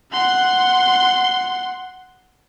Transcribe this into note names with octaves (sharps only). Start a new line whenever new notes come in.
F#5 C6